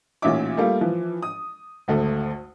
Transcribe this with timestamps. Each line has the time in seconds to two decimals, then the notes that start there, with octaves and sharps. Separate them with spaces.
0.22 A1 A#2 C#4 D#4 E5 D6
0.57 G3 A3 A#3 F4
0.81 E3 F3
1.22 D#6
1.88 G#1 D2 A3